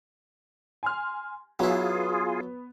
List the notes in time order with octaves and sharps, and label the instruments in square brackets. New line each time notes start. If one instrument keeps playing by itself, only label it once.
[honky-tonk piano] G#5 C6 F6
[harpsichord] F#3 E4 [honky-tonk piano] B3 [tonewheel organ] F4 G#4